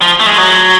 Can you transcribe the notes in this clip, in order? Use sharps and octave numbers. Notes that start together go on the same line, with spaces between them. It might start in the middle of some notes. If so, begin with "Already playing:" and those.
F3
A3
G#3
F#3